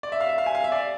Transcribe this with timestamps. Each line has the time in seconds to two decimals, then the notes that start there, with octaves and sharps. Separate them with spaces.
0.03 D5
0.12 E5
0.21 F5
0.29 E5
0.38 F5
0.46 G#5
0.55 F5
0.64 E5
0.72 D5